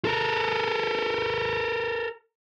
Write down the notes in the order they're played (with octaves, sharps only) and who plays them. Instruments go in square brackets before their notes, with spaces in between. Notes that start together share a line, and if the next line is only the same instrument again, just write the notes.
[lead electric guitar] A4 A#4